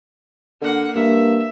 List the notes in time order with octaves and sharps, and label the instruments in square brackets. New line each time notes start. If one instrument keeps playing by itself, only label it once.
[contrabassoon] D3 [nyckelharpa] A#3 F#5
[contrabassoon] G2 [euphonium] A#3 [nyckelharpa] E5